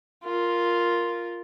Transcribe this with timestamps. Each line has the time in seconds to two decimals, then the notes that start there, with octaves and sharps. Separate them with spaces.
0.24 F4 A#4